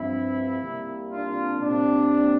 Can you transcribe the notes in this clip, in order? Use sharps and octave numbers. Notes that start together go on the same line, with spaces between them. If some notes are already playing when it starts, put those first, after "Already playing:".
Already playing: G2 F3 C4 E4
C2 C3 G3 A#3
D4 F4
A#2 G3 C4 D4